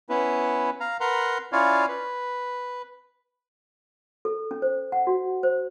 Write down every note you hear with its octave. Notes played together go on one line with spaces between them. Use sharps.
B3 C#4 E4 B4
F5 A#5
A#4 B4 F#5 A#5 C6
C#4 E4 F4 C#5 D5 F5
B4
A4
C#4
C5
F#5
F#4
C5